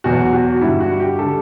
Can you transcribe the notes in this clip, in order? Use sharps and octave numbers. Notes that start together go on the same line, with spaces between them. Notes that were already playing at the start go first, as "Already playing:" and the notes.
E2 B2 F#3 F#4
F#4
G2 D3 G3 E4
F#4
G4
D3 G3 A4